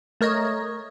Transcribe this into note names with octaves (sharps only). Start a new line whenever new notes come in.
A3 A#4 C#5 D#5